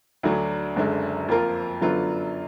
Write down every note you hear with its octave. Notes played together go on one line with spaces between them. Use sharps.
D2 D3 F#3
F#1 F#2 D3 G#3
F2 F3 A#3 F4 A#4
F#2 D3 F#3 B3 F4